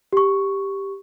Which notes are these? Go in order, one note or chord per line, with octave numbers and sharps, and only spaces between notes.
G4 C#6